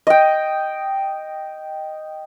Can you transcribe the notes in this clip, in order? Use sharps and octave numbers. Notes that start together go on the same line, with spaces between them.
D#5 G5